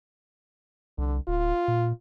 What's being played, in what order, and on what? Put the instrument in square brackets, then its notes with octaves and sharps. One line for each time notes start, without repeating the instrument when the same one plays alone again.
[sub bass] C2 [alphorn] D3
[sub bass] D1 [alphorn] F4
[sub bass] A#2